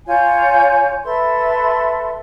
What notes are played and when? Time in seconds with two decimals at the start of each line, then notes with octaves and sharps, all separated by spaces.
0.06 F4 C#5 G#5 G6
1.03 A4 B4 E5 C6